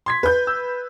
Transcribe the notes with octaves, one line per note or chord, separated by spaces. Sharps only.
C6 G#6 B6
B4 G6
E6